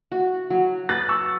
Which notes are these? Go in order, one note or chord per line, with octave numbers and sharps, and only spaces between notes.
F#4
F#3
B4 F#6 A6
C#6 E6